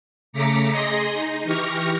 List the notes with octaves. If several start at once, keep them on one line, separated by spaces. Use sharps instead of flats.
C#3 A3 A#5 D6 B6 C#7
G#4 D#5 C6 A#6
D#4
E3 G4 C#6 F6 A#6